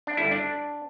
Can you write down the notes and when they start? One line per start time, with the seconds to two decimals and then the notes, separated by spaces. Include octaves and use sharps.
0.07 D4
0.17 G2 D3 G3 E4
0.31 D4